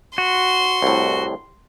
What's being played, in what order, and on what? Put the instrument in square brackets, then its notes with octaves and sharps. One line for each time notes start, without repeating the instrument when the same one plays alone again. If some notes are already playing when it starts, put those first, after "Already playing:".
[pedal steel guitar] F#4 [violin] C6
[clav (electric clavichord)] C2 A2